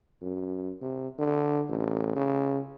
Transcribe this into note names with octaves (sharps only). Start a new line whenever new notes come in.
F#2
C3
D3
A1
C#3